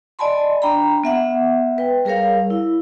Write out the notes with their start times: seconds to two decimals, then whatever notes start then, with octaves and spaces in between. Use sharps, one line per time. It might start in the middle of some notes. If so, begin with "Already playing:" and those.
0.19 D5 D#5 G#5 A5 B5 C6
0.62 D4 G5 A#5 B5
1.04 B3 E5 F#5
1.78 B4 G5
2.05 G3 G#4 A#4 C#5 F5
2.50 E4